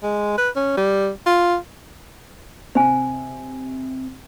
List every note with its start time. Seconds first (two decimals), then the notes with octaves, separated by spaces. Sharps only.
0.03 G#3
0.38 B4
0.56 C#4
0.77 G3
1.27 F4
2.75 C3 C5 G#5